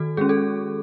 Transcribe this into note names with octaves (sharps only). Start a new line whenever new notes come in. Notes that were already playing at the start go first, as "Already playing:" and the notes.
Already playing: D#3 F#4 A4
G#3 C#4 G#4
A4